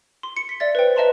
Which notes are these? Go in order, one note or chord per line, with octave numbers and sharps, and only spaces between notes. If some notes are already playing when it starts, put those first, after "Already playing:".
C6
C#7
B6
D5 E5 A6
B4 C5 G5
B4 D#5 E5 A5 A#5 C6